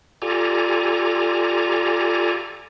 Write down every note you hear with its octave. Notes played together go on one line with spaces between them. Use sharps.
F4 G4 A4 D5 G#5 A#5